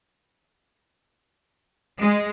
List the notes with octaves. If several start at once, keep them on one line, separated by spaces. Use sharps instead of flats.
G#3